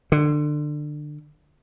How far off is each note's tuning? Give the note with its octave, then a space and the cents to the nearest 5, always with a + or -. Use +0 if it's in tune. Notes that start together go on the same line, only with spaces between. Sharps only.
D3 +25